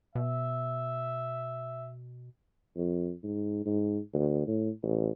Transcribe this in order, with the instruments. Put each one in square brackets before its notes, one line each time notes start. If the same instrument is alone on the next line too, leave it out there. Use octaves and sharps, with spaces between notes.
[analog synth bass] B2 [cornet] E5
[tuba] F2
G#2
G#2
D2
A2
A1